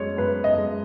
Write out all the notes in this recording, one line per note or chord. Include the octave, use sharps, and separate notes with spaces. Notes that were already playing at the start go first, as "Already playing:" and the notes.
Already playing: F#2 G#3 C#5
F#2 B4
D#5
G#3